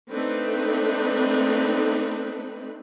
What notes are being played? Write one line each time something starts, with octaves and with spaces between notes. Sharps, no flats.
A3 C4 D4 D#4 B4